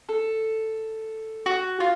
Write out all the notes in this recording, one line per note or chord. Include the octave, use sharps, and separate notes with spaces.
A4
F#4
F4